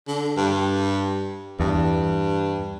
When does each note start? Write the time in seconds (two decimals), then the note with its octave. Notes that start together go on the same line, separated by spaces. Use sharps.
0.08 D3
0.37 G2
1.60 E2 G2